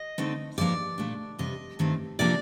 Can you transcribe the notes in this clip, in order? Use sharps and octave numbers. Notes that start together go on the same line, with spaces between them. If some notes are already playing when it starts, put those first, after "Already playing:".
Already playing: D#5
D3 A3 C4 D#4
G2 F3 A#3 D4 D5
A#2 A3 D4
F2 C3 G3 D#5
G2 D#3 A3 C4
C3 F3 A#3 D4 D5